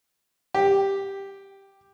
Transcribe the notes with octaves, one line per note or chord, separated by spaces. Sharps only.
G4